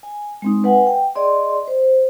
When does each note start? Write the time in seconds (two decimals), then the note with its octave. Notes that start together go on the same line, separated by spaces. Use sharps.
0.03 G#5
0.42 G#3 C4 D#4
0.64 B4 F#5 G#5
0.87 G5
1.15 G#4 D5 D#5 C6
1.67 C5